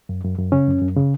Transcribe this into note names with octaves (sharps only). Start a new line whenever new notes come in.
F#2
F#2
F#2
C#3 C#4
F#2
F#2
C#3